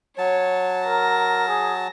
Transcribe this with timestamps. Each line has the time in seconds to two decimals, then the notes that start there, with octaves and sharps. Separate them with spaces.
0.18 F#3 C#5 A5
0.87 A#4 A#6
1.48 G#4